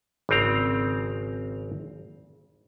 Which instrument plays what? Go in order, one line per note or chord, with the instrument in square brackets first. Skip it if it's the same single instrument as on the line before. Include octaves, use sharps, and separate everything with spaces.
[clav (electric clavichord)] G#1 C#3 C4 A#5